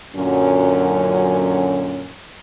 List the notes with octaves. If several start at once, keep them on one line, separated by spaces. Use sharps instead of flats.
F#2 A#2 D3 F#3 C#4